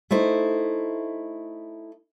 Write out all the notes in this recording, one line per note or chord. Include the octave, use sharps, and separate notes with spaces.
A3 D#4 E4 C5